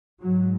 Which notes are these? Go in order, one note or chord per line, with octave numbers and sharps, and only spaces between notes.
G#2 F#3